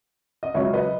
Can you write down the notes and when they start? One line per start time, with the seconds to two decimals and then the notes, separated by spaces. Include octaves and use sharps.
0.43 D#5
0.54 C#2 C#3 F#3 C#5 E5
0.73 B4 D#5